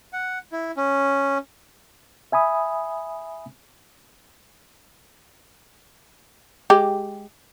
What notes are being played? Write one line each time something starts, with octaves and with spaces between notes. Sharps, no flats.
F#5
E4
C#4
E5 G#5 B5 D#6
G#3 G4